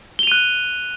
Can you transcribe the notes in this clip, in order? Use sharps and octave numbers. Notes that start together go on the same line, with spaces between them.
F#6 D#7 F7 G7